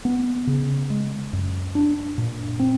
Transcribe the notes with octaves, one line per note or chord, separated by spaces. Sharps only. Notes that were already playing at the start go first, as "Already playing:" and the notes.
B3
C#3
G#3
F#2
D4
A#2
C4